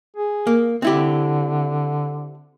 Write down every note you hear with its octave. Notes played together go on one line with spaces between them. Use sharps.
G#4
A#3
D3 C4 E4 G4